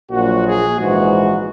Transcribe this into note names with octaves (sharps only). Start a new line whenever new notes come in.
A#1 A#2 F#3 F#4
G#4
A#1 G#2 E3 F#4